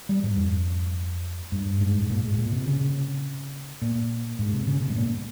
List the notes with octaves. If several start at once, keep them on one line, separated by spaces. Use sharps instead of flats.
G3
G#2
F2
G2
G#2
G#2
A#2
G#2
A#2
C3
C#3
A#2
G#2
C3
C#3
C3
G#2
A#2